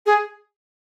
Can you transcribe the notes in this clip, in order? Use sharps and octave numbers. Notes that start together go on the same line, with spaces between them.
G#4